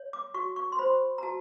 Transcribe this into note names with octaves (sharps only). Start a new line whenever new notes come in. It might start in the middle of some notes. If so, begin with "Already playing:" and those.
Already playing: C#5
D6
F#4 C#6
C#6
C6
C5 B5
A#5
F#4 A5